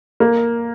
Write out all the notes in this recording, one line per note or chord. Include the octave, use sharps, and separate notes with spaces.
A#3